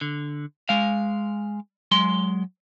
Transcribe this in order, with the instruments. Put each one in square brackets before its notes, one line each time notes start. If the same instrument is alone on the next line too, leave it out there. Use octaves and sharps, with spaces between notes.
[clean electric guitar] D3
G#3 F5
F#3 G#3 C6